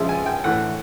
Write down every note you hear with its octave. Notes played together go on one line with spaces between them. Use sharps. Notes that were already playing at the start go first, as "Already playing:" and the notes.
Already playing: C#3 F3 G#3 E5
G#5
G5
A2 E3 A3 F#5